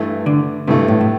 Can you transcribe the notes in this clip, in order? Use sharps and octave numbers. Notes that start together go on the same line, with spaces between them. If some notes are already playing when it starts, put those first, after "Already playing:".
Already playing: G2 E3 A3
D3
G2 C3 E3 A3
A2
A2